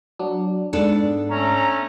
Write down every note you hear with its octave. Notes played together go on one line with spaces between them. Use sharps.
F#3 D4
G#2 B3 D4 A4
A3 C#4 A#5